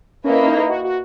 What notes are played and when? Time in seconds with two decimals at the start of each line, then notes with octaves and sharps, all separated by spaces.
0.24 A#3 C#4 E4 B4 D#5
0.43 C#4
0.48 D#4
0.69 F#4
0.84 F#4